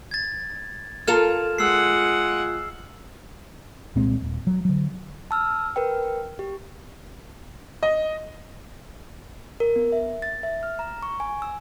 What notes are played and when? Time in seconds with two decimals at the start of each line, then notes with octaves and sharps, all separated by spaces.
0.11 G#6 A6
1.07 F4 A4 A#4 F6 E7
1.58 G#3 F#5 E6 C7
3.95 C2 A#2 G#3 C4
4.22 D#1
4.47 F#3
4.65 D3 F#3
5.31 A5 E6 F6
5.76 A#4 B4 G5
6.39 G4
7.83 D#5
9.60 A#4
9.76 B3
9.92 E5
10.22 A6
10.43 E5
10.63 F6
10.79 A#5
11.03 C#6
11.20 G#5
11.42 E6